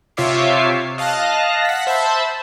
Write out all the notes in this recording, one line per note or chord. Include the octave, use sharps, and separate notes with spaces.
C3 F4 C#5 E5 D6 C7
D#5 F5 A5 F#6 A#6
F#5 B6
C5 E5 A5 B5